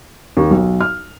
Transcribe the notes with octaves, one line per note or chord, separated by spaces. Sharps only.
D#2
B1
F6